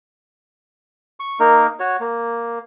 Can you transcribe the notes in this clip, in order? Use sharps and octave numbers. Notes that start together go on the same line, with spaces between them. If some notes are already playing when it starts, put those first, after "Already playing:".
C#6
A#3 D#4 A#4
F#4 C#5
A#3